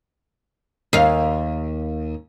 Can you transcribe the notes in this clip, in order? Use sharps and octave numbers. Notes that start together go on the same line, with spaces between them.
D#2 F5